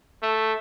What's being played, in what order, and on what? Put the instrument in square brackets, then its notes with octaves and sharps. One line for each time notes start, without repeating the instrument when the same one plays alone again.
[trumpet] A3